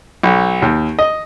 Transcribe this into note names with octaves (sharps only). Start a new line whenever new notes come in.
B1
D#2
D#5